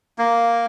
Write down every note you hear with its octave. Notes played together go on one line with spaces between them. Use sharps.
A#3